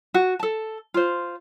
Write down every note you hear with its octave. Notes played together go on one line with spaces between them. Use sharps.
F#4
A4 A5
F4 C5